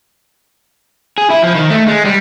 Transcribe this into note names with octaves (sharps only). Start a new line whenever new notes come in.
G#4
E4
F3
D#3
A3
G#3
G3